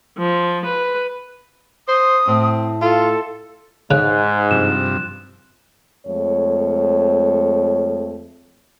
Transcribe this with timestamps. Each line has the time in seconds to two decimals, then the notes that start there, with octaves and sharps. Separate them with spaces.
0.18 F3
0.65 B4
1.88 C5 D#6
2.28 A2 C4
2.82 F4 A4
3.91 G#2 C#3 F#6
4.51 G2 C3 F3 E7
6.06 F2 G#3 A3 C#5